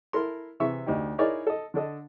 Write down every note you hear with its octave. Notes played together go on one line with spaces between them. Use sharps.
E4 A4 A#4 C6
C3 E3 G#4 E5 C#6
D2 D#4 G4
D#4 E4 G#4 A#4 C#5 D5
A4 D#5
D3 D4 A4 D#5